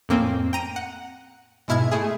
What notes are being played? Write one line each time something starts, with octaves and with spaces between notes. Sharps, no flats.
F2 A2 A#3 C4 C#4
G5 A#5 D#7
F#5
G#2 B2 E4 F6 G#6
A3 E4 G#4